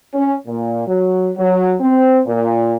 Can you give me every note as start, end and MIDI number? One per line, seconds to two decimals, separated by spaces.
0.14 0.34 61
0.47 0.86 46
0.87 1.30 54
1.38 1.74 54
1.80 2.20 60
2.27 2.77 46